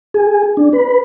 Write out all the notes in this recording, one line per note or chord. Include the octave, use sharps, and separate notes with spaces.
G#4
D4
B4